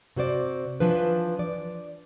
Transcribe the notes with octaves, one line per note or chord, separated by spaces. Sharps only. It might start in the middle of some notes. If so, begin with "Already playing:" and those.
C3 F#4 C5 D5
E3 F3 D4 B4
D5